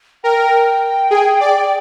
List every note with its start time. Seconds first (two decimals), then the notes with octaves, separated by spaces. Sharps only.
0.24 A#4 G5
1.11 G#4
1.40 D5